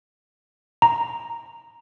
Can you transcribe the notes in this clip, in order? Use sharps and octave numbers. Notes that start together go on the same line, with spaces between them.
A#5